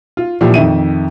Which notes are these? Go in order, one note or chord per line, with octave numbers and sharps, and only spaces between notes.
F4
A#2 E3 F3 E4 G4
F2 D#3 E5 D#7